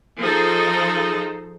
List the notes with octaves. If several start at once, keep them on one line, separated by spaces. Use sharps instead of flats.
F3 D#4 G#4 A4 C5 A#5